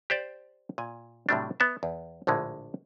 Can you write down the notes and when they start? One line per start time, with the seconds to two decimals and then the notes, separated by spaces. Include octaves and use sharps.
0.10 G4 C5 D5
0.78 A#2 G#5
1.29 A2 C3 F#3 G3 A3 D4
1.60 B3 E5
1.83 E2
2.27 A#1 A2 D3 G#3